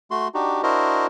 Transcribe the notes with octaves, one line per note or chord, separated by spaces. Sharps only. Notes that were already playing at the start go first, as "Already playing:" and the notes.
A3 F#4 C6
D4 D#4 F#4 G4
D4 E4 F#4 A#4 C5 D#5